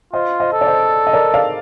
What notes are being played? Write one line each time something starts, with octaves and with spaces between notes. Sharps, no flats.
F4 C5 D#5
C5 D#5
A4
D5
C5 D#5
D#5
A#4 D5
D5 F5